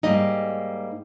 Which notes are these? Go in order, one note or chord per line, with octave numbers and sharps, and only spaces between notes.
G#2 G3 A#3 D#4 D#5